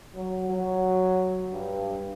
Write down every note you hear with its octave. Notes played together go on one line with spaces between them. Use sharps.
F#3
F#3
G2